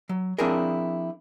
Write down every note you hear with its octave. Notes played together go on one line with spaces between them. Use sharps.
F#3
F3 C4 D4 E4 G#4 A#4